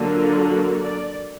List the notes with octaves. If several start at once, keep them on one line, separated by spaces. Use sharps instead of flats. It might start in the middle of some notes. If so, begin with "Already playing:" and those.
Already playing: D3 F#3 A#3
F4
F#4
D5